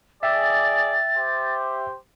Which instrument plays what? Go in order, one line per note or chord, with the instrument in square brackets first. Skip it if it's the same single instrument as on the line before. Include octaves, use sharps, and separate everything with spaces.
[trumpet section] G#4 D5 [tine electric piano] E5 G5 E6 [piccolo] A6
[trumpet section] G4 C5